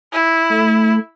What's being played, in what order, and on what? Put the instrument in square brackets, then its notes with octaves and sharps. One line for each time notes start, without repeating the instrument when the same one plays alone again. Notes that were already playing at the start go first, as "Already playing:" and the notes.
[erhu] E4
[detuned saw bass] A3